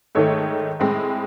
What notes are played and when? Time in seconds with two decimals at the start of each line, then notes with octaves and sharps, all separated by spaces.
0.15 G#2 D#3 A3 A4 C#5
0.80 A2 G#3 C4